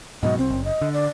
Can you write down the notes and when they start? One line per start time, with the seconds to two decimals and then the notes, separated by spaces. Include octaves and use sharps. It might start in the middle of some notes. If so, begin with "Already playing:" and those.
0.23 G#2 B2 F#3 D#5
0.38 C2 C4
0.50 F#1
0.65 D#5
0.81 D3
0.94 D5